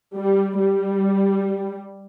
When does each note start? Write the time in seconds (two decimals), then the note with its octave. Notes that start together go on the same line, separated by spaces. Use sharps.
0.15 G3
0.58 G3